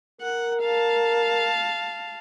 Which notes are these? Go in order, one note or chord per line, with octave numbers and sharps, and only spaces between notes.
A#4 F#5
F5 A5